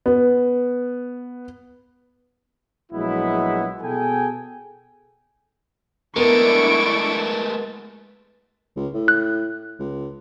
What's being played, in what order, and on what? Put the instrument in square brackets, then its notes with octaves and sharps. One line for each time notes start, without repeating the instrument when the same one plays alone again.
[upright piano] B3
[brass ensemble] A#1 F#3 G#3 B3 E4
B2 G#4 A4 G5 G#5
[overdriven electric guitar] G#3 A3 [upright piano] B3 A#4 [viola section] D4 E4 [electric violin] C#6 D7
[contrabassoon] C#2
A2
[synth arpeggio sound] F#6
[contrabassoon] C#2